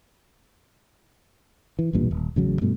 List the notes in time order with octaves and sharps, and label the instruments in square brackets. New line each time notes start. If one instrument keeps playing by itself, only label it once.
[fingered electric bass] E3
B1 E2 G2 A#2
D#1
A1 C#3 F#3
G2 B2 A3